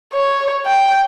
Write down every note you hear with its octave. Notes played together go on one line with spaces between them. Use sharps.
C#5
G5